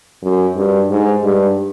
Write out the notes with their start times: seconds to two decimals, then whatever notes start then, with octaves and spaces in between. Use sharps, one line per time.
0.23 F#2
0.56 G2
0.90 G#2
1.24 G2